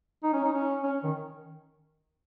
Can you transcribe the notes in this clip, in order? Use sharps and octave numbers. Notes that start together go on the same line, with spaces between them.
D#4
C#4
D#4
C#4
C#4
D#3